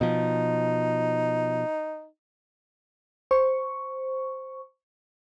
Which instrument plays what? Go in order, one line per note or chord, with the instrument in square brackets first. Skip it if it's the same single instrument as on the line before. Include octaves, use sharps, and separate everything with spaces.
[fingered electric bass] B2 F3 [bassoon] D#4
[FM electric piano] C5 C#6